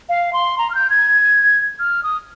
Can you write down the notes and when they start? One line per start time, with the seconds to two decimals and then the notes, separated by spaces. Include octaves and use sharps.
0.09 F5
0.33 C6
0.58 A#5
0.70 F6
0.75 G6
0.90 G#6
1.79 F6
2.03 D#6